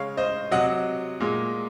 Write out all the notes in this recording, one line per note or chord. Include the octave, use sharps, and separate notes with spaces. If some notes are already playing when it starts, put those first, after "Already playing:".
Already playing: C#3 G#3 C#5 F5
C5 D#5
C3 F#3 D#5 F#5
A#2 G#3